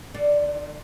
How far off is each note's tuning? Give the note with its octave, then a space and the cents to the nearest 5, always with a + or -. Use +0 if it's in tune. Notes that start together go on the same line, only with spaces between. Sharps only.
D3 +40 D5 +0